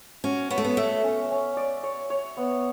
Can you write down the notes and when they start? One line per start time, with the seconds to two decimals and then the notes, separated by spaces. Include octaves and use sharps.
0.24 C#4 F#4
0.50 B3 C#5
0.58 A3
0.65 B3
0.77 A3 E5
1.04 C#4
1.31 C#4
1.57 D5
1.83 C#5
2.10 C#5
2.37 B3